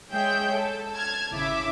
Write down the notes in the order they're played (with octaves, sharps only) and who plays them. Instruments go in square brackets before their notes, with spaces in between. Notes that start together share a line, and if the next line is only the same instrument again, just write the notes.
[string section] G#3 G#4 C#5 E5 G5 G6
A4
A5 F6 G#6
G#1 C#3 E4 E5 D6